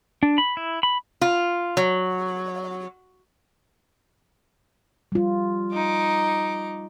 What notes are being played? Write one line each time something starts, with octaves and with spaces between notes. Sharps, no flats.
D4
B5
E4
B5
F4
F#3
G3 F4
D#4 D6